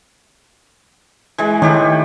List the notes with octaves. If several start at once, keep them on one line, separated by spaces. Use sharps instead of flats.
E3 G#3 G#4
A2 D#3 G4 B4